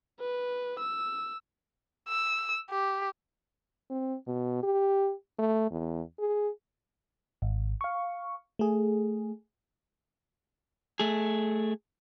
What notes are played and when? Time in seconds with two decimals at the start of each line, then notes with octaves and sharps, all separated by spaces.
0.20 B4
0.80 E6
2.09 E6
2.70 G4
3.90 C4
4.28 B2
4.63 G4
5.39 A3
5.71 E2
6.19 G#4
7.42 G#1
7.81 F5 C#6
8.59 A3 G#4
11.00 A3 G#4